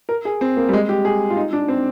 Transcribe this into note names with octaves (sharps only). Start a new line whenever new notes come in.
A#4
G#4
C4
A#3
G3
G#3
G4
G#4
F4
D#4
D4
C4